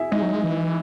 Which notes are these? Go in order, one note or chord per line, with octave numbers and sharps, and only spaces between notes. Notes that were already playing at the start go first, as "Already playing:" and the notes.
Already playing: E4 F#4 G#4 E5 G#5
G#3 D#4 D#5
F#3
G#3
E3